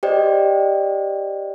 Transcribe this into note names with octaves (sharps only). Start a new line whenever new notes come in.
G4 C5 D5 D#5 G5